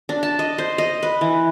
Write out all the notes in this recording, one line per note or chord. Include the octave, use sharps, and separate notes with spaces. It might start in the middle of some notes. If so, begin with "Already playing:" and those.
D4
A5
D#5
C5
D#5
B4
E3